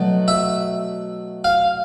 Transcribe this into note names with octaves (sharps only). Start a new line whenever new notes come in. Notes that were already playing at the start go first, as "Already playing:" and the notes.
Already playing: B2 F#3 A3
E5
F5